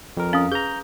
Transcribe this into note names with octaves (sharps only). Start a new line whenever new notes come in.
F2 A#4
C#4 F5 D#6
G#4 B4 A#5 G6